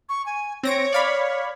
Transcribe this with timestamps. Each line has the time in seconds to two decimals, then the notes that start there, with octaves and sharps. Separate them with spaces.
0.09 C#6
0.26 G#5
0.63 C4 C#5 A#6 D7
0.92 D5 F5 B5